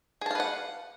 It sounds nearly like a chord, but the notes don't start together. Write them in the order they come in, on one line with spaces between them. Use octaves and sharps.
G#4 A5 F5 B4 F#5